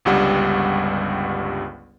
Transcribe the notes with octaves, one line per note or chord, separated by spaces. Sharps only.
G1 C#2 G2 G3 F#5